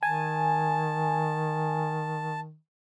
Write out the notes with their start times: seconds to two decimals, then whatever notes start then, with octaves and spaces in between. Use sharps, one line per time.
0.03 D#3 G#5 A5